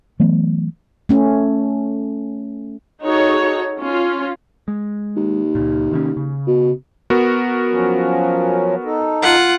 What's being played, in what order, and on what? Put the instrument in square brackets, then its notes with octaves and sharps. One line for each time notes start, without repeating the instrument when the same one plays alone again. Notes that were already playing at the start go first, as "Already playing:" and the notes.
[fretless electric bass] E3 F#3 A3 B3
[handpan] A3 C#4
[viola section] D#4 F#4 G#4 A4 C#5
C#4 F4
[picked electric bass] G#3
[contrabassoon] D#2
[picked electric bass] C#2 A#2
C3 D#3 C#4
C#3
[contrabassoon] B2
[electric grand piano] B3 F#4 A#4
[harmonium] F3 F#3 C#4
D#4 A4
[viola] F4 F#5